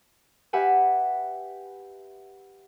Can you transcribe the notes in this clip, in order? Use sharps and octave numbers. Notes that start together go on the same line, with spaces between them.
G4 B4 E5 F#5 G#5